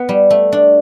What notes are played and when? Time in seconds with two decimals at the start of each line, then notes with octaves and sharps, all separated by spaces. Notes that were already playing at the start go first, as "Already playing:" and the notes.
Already playing: B3
0.09 G3
0.30 A3
0.52 D4